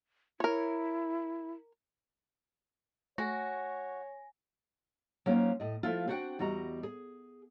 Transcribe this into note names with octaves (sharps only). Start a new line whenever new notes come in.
E4 A#4 C#5
A3 F#4 C#5 G#5 A#6
F#3 A#3 C#4 D#4 F4 C5
A2 D#5
F3 A3 E4 F4
C4 D4 F#4 B4 F#5 G5
E2 G3 F#4 D#5 A#5
G#4